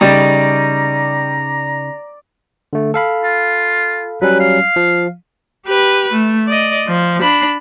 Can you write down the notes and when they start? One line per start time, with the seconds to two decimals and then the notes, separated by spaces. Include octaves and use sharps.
0.01 C#3 G3 D#4 D5 A#5
2.73 D3 A3
2.94 A4 F5 B5
3.24 F4
4.22 F#3 G3 C#4 B4
4.40 F5
4.76 F3
5.66 G4 B4
6.13 A3
6.47 D5 D#5
6.88 F3
7.21 D4 B5